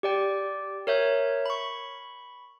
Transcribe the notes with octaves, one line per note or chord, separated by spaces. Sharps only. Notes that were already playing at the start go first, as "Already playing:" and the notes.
G4 D5 G5
A#4 C#5 E5 G6
B5 C#6